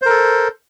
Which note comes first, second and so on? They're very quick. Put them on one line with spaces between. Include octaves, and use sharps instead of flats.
C5 A#4 A4